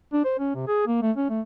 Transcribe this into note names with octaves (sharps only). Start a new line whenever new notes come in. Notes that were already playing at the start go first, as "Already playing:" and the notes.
D4
C5
C#4
C3
G#4
A#3
A3
C#4
A3